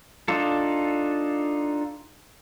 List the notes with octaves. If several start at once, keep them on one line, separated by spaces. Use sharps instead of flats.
D4 D#4 F4 A4